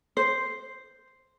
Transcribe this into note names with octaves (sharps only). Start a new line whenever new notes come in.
C5